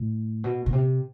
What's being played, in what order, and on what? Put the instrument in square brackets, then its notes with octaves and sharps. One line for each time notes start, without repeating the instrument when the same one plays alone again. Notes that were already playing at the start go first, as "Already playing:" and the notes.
Already playing: [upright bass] A2
B2
B2
C3